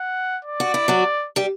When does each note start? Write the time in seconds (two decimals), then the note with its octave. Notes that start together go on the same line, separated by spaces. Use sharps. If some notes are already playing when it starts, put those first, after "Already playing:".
Already playing: F#5
0.45 D5
0.60 F#4
0.74 E4
0.88 F#3 F#4
1.36 G3 G4